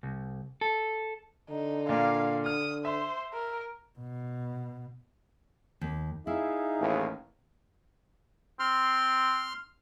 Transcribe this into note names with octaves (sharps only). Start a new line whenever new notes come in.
C2
A4
D3 D#4
A#2 A#3 D5 F5
D#6 F6
C5 E5
A#4
B2
D#2
D#4 E4 G#4 E5 F5
A1 D#2
C4 C6 F6